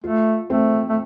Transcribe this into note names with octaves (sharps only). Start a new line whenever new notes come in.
A3 F4
A3 C4
A3